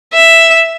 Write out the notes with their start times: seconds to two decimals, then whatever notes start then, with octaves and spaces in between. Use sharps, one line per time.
0.14 E5